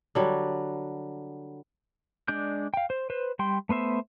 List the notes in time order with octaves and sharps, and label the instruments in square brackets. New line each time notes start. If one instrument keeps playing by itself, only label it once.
[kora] D3 F#3 G3
[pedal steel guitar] G#3 D4 D5 G6
F5 G5
C5
B4 C5
G3 G5 C6
A3 B3 C5 E5